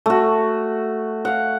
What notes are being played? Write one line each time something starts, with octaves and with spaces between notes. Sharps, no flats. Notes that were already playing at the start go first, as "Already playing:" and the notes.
A3 F#4
F5 F#5